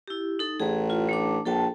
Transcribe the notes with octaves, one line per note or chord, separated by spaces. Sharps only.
E4 G4
D#4 A4
A1 G#4
F4
A3 D4 D6
A#1 A4 G5 A5